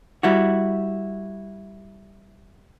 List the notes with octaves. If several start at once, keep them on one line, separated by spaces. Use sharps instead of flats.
G3 E4 F#4